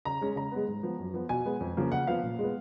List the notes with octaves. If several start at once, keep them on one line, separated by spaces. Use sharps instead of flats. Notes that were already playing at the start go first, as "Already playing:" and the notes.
C#3 A#5
G#3 C#4
C#3 A#5
G#3 B3
G#2
F3 B3
F#2
F3 B3
B2 G#5
G#3 B3
F2
C#3 F3 A#3
C#3 F#5
F3 B3 F5
A#2
G#3 B3